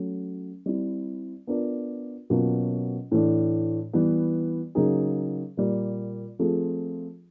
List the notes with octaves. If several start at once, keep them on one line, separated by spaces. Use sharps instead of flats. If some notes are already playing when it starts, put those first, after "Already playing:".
Already playing: F#3 A3 C#4
G3 C4 E4
B3 D4 F4 A#4 D5
B2 F#3 A#3 C#4 F4
A2 E3 A3 D4
E3 G3 B3
C#3 F#3 A#3 D#4 G#4
A#2 G3 A#3
F3 A3 C4 F4 G#4